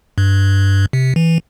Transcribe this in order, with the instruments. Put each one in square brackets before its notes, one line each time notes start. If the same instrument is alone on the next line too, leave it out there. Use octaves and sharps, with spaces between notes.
[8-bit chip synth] G2
C3
E3